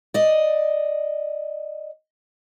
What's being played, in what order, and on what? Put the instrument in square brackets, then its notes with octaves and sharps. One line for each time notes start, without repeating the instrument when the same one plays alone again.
[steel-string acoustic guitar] D5 D#5